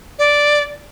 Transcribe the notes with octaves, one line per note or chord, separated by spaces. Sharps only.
D5